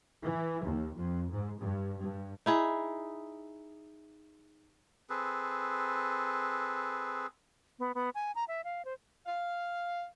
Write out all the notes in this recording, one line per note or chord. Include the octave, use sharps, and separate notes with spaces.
E3
D#2
F2
G#2
G2
G2
D#4 E4 G#4
C4 G#4 A4 B4
B3
B3
G#5
A#5
E5
F5
C5
F5